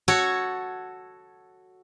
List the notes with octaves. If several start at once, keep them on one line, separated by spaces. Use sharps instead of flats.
F#4 A4 C#5